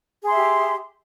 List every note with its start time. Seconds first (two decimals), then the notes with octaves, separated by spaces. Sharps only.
0.22 G#4
0.27 C6
0.31 E5
0.35 G4